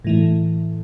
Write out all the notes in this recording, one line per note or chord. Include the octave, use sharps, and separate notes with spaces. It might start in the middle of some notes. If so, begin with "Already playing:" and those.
A2 E3 A3